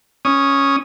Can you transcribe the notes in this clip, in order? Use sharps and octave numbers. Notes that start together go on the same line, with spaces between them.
C#4 D#6